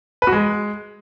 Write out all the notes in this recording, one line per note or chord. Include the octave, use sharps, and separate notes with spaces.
B4
F#4
G#3